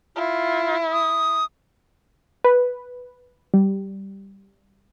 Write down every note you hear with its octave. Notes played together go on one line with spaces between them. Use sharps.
E4 F4
D#6
B4
G3